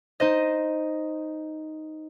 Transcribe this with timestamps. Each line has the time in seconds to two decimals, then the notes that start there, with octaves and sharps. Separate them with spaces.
0.20 D#4 C5 D#5